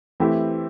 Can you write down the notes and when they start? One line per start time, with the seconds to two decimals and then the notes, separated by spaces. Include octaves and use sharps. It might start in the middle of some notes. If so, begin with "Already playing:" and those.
0.20 E3 A3 C4 E4 G4